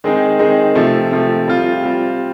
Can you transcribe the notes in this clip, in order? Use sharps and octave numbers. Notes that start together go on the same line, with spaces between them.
D#3 G#3 C4 D#4 G#4
D#3 G#3 C4 D#4 G#4
C3 F3 A3
C3 F3 A3
G3 C4 F4
G3 C4 F4